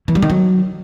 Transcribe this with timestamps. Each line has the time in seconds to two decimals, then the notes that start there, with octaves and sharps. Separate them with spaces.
0.08 E3
0.15 G3
0.22 D#3
0.30 F#3